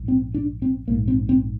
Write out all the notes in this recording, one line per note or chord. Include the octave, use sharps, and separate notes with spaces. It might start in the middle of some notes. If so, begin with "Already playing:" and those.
Already playing: A#1 G#2
C4
D4
C4
A#1 G#2 A#3
C4
C4